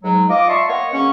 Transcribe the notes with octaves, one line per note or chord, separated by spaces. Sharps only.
G#2 F#3 G#3
F4 D#5 D6
D5 E5 A5 C6 C#6
A#3 B3 C#5 D#5 C#6
C#3 F#3 A#3 C#4 F#5 C#6